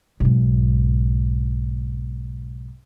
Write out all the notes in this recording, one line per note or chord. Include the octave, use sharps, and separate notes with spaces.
B1 G#2